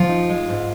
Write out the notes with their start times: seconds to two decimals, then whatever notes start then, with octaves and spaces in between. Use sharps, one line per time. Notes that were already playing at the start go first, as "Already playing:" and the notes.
Already playing: F3 F4
0.09 D#4
0.29 G#3
0.49 G#2